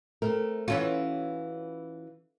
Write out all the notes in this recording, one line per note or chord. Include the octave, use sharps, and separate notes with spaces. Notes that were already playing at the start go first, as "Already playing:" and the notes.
A3 C4 A#4
E3 C#4 F4 F#4